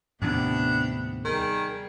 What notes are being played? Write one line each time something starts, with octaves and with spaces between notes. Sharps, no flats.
D#2 A2 C3 B3 D4
D#3 G3 G#4